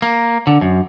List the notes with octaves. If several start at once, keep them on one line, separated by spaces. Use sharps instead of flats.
A#3
D3
F#2